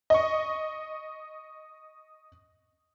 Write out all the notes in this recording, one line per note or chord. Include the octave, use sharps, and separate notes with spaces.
D#5 C#6